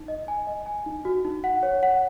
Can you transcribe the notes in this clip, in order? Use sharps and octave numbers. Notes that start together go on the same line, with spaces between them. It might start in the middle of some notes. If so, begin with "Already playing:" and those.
Already playing: D#4
D#5
G#5
D#5
G#5
D#4
F#4
D#4
F#5
C#5
F#5